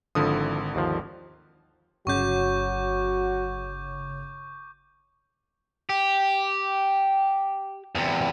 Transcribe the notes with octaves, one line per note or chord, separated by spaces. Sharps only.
G#1 D3 F3 E4 D#6
D#2 F3
G1 C#3 F#3 F#4 C#5 C#6 D6 G6
G4
E2 C3